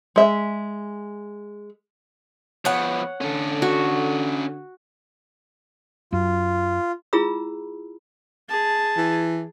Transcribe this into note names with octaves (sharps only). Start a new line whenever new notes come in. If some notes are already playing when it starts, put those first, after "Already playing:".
G#3 E5
F3 B3 C#5 F#5
D3 C#4 A4
F#4
F#2 F4
E4 F4 G#4 A#5 B5 E6
G#4 A5
E3